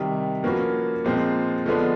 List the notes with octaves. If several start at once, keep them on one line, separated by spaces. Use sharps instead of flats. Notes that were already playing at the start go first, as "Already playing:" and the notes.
Already playing: C3 D#3 G3
F3 A#3 C#4 F#4 B4
A#2 F3 G#3 C4
D3 F3 G#3 B3 D4